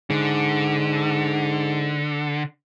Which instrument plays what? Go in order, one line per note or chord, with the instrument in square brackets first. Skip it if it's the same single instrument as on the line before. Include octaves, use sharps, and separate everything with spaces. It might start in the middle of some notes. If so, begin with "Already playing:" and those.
[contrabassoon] G#2 [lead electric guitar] D3